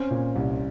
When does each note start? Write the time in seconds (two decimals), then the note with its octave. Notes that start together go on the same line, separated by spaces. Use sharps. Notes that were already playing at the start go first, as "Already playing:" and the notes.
Already playing: C4 C#4
0.11 A#2
0.35 C2